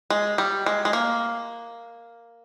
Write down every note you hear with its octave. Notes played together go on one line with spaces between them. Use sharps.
G#3
G3
G#3
G#3
A#3